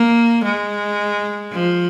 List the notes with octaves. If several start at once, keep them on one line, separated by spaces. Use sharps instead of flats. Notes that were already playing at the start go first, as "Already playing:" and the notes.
Already playing: A#3
G#3
F3